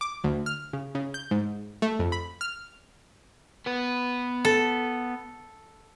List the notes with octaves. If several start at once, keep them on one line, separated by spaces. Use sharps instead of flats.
D6
D2
F6
C#3
C#3
G6
G#2
A3
F2
B5
F6
B3 B4
A4